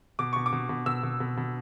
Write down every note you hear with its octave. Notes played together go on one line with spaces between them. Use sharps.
B2 D6
B2 C#6
D6
B2
B2
B2 E6
B2
B2
B2